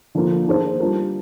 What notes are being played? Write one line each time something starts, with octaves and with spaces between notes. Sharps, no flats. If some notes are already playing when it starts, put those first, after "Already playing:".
D3 F3 A#3 F4
D#3 A#3 D4 G#4 C5
G3 D4 F4 A#4